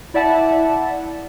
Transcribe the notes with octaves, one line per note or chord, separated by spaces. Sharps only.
E4 D5 E5 F#5 A5